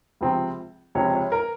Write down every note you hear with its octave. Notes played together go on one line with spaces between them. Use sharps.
C#2 C3 F3 C4
C#2 C3 F3 C4 C#5
C#5
A#4